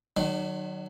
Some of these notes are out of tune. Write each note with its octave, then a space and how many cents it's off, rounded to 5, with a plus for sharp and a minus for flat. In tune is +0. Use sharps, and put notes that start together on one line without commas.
D#3 -30 F#3 +10 D4 +45